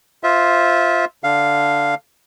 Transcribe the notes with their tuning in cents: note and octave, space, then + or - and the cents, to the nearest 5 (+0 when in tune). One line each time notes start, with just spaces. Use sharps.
F4 +0 C5 +0 E5 -20
D3 +0 D4 +0 F5 +0